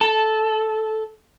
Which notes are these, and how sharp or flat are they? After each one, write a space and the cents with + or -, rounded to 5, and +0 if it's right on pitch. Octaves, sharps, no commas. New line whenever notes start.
A4 -10 A5 -10